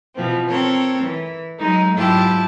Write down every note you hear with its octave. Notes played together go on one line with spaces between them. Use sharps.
B2 E3 F3 B3 C4
C4 A4 A#4 C#5
E3
F#3 G#3 D#4
G#2 F#3 E4 F4 G4 A5